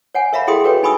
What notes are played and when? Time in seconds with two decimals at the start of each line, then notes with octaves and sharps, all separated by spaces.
0.15 C#5 F#5 G#5
0.32 A#4 C#5 E5 F5 A#5 B5
0.47 E4 G#4 A4 G5 C6 D#6
0.64 F#4 A4 B4 C#5 G5
0.83 D#4 G#5 B5 C#6 D#6 E6